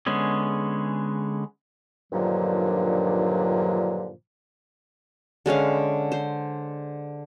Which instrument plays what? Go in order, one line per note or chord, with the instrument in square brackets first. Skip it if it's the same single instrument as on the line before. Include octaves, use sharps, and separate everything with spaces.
[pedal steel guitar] D3 G#3 B3 C#4 G#4
[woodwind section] G2 A#2 D3 D#3 F3 F#3
[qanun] D3 G#3 C#4 F5
C5